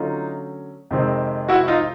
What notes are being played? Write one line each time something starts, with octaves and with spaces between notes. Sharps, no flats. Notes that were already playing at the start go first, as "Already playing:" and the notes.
Already playing: D3 F#3 A3 C#4 D#4 F4
F2 C3 D#3 G#3 C4
E4 F#4
D#4 F4